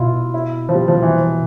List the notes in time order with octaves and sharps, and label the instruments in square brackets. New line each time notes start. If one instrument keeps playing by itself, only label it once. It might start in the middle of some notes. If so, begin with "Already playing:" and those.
Already playing: [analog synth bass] B2 [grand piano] E4 F4
[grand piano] E4
F3
G3
F3
E3